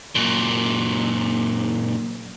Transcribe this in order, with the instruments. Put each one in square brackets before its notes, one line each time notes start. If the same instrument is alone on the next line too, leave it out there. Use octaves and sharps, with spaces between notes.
[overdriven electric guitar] F#2 A#2